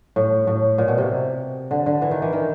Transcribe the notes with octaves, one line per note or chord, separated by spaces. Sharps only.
A2
A2
A#2
B2
C3
D3
D3
E3
D#3
E3
D#3